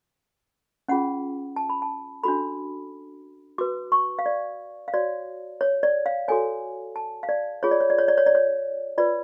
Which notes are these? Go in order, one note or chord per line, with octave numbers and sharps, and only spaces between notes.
C#4 F4 G#4 F#5
A5
B5
A5
D4 F#4 A4 B5
F#4 B4 D6
C#6
F5
D5
F5
F#4 C#5 D5
C#5
D5
F5
F#4 A4 C#5 G#5
A5
F5
D5
F4 G#4 C#5
D5
C#5
D5
C#5
D5
C#5
D5
C#5
F4 B4 D5